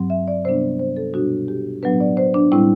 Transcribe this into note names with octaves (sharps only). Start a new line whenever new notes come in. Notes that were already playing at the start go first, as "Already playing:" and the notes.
Already playing: G2 F#3 C4
E5
D5
C3 G3 B3 D4 C5
C5
A4
B2 G3 D4 F#4
G4
A2 F#3 B3 D4 B4
D5
C5
D4
A2 G3 C4 E4